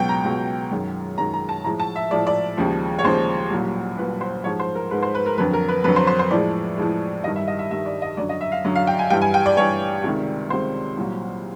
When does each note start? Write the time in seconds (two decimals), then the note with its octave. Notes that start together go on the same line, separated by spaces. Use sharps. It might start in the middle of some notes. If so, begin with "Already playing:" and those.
Already playing: C#2 B2 F#3 G5
0.09 A#5
0.24 C#2 B2 F#3
0.71 F#2 D#3 G#3
1.18 F#2 D#3 G#3 A#5
1.33 A#5
1.49 A5
1.64 A2 F3 G#3 A#5
1.80 A5
1.96 E5
2.11 A2 F3 G#3 D5
2.27 D5
2.57 D#2 C#3 F3 G#3
2.99 C#5
3.04 D#2 C#3 F3 G#3 C5
3.50 C2 A#2 F#3
3.98 C2 A#2 F#3 B4
4.21 C5
4.44 G#2 F3 G#3 C#5
4.60 C5
4.75 A#4
4.91 G#2 F3 G#3 B4
5.03 C5
5.15 B4
5.26 A#4
5.38 F2 D3 F#3 B4
5.53 A#4
5.68 B4
5.84 F2 D3 F#3 B4
5.96 C5
6.07 C5
6.19 C5
6.31 A2 F3 G#3 D5
6.77 A2 F3 G#3
7.24 G2 D#3 G3 D#5
7.36 E5
7.47 D#5
7.59 E5
7.71 G2 D#3 G3 E5
7.86 D5
8.02 D#5
8.17 F#2 D3 F#3 D5
8.29 D#5
8.41 E5
8.52 F5
8.64 F#2 D3 F#3
8.75 F5
8.87 G5
8.99 G#5
9.10 G2 E3 G3 G5
9.22 G#5
9.34 G5
9.46 D5
9.57 G2 E3 G3 C#5
10.04 C#2 C3 D#3
10.50 C#2 C3 D#3 C5
10.97 C2 A#2 F#3